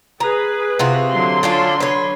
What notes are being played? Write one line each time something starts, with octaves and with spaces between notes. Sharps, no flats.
G#4 B4 A#5
C3 F4 F#4
D3 F#3 C6
C#4 D4 F4
B4 C#5